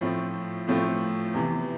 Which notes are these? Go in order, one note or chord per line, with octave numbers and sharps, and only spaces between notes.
A2 F3 A3 C4 F4
A2 F3 A3 C4 F4
E2 C3 E3